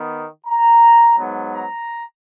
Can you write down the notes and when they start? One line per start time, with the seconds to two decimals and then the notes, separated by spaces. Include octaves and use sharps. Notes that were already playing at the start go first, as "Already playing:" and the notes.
Already playing: D#3 B3
0.46 A#5
1.17 G#2 F#3 B3
1.52 A#5